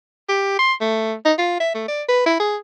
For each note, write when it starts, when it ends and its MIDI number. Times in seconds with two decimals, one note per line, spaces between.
0.29 0.56 67
0.59 0.73 84
0.81 1.14 57
1.25 1.33 63
1.38 1.58 65
1.60 1.70 76
1.75 1.84 57
1.88 2.03 74
2.08 2.25 71
2.26 2.36 64
2.40 2.56 68